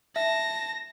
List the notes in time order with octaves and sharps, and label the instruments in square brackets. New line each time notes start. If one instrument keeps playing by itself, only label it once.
[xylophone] E5 [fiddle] A5 [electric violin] A#6